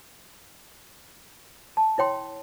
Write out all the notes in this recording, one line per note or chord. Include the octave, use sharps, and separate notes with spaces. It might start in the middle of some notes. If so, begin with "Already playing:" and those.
A5
E4 C#5 G5 C6